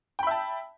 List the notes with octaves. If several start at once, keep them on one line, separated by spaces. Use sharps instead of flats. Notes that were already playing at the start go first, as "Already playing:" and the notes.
E5 G5 A5 B5